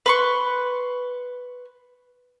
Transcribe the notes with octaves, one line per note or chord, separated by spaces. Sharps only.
B4 C6 C#6